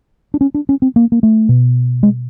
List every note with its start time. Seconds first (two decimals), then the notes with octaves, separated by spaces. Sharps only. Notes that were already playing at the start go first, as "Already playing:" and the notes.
0.34 D4
0.41 C#4
0.54 D4
0.69 C#4
0.82 C4
0.96 A#3
1.12 A#3
1.23 A3
1.49 B2
2.03 G#3